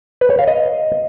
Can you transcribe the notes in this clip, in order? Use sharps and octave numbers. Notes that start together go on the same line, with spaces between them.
B4
C#5
F5
D#5